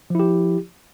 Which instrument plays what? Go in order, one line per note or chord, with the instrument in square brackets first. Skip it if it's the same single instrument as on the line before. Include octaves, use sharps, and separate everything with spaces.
[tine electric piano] F3
E4
G4